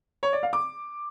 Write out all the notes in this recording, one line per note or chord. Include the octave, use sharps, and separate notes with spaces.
C#5
D5
F5
D6